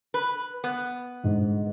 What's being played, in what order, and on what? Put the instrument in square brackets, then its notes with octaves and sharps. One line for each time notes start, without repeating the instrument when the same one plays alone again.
[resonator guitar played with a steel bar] B4
B3
[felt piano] G1 G#2